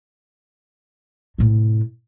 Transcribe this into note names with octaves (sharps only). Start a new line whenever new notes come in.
A2 C3